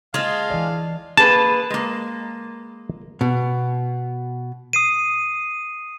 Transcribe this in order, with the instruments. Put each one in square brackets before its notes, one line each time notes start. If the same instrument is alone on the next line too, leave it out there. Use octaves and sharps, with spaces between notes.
[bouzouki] G#3 F4 [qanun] D#5 A5 [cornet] F5
[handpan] E3 D5
[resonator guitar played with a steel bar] A#3 G#4 B4 [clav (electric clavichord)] A5
[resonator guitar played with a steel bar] G#3 A#3
[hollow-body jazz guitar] B2
[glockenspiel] D#6 C7 D#7